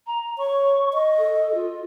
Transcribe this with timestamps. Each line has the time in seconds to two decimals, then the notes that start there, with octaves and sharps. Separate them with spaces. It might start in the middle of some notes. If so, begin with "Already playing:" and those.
0.07 A#5
0.38 C#5 C#6
0.93 D#5
1.18 A4
1.54 F4